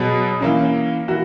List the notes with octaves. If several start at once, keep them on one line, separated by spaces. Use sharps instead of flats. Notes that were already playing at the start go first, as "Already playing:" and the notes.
Already playing: B2 F#3 B3 G#4
E3 A#3 C#4
E3 A#3 F#4